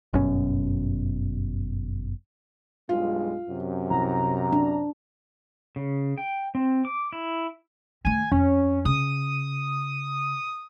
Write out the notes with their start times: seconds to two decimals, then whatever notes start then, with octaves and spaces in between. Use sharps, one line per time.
0.13 G1 F#2 B2 C#4
2.89 B1 G2 G#3 F4
3.49 F#2 C3
3.90 C2 A#5
4.53 D4
5.76 C#3
6.18 G5
6.55 C4
6.85 D6
7.13 E4
8.05 D#3 A3 G#5
8.32 F2 C#4
8.85 C#3 D#6